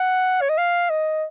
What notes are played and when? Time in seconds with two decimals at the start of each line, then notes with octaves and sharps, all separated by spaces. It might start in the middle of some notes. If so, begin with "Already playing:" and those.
Already playing: F#5
0.41 C#5
0.50 D#5
0.58 F5
0.90 D#5